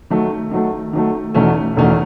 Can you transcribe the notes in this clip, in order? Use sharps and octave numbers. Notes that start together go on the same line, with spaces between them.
D#3 F#3 A3
D#3 F#3 A3
D#3 F#3 A3
E1 E2 D#3 A3 C#4
E1 E2 D#3 A3 C#4